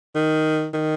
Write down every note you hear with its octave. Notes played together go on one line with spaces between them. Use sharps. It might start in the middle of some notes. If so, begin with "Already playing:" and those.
D#3
D#3